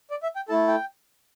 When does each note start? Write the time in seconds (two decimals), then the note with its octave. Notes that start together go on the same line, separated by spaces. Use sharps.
0.10 D5
0.23 E5
0.36 G5
0.48 A3 E4 A4 A5
0.68 G5